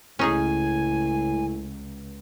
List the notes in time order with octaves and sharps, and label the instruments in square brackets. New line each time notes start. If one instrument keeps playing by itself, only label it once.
[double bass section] C#2 [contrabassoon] A2 [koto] C#4 D#4 G#4 [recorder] G#5